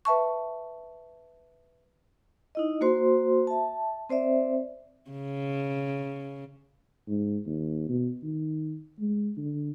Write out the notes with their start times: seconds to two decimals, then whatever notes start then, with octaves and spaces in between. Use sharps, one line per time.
0.05 B4 E5 A5 C#6
2.55 D#4 E4 D#5
2.81 A#3 F#4 C5 C6
3.47 E5 A5
4.09 C4 C5 D5 E5
5.10 C#3
7.08 G#2
7.47 D#2
7.89 B2
8.23 D#3
9.00 G#3
9.37 D3